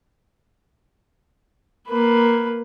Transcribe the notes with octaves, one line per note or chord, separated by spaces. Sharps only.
A#3 B4